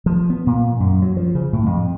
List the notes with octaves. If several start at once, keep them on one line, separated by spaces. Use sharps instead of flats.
F3
B3
A#2
F#2
F#3
F3
C#3
A2
F2